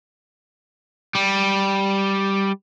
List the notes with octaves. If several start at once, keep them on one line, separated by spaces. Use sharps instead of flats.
G3